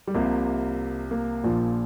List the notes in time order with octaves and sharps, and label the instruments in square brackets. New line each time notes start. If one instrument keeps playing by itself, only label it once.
[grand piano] G3
C2 C3 F3 A#3
A#3
A#1 A#2 F3